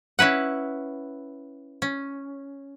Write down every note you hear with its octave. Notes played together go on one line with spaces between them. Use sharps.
C#4 E4 B4 F#5
C#4